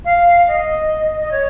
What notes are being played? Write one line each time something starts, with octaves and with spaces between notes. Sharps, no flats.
F5
D#5
D#5
C#5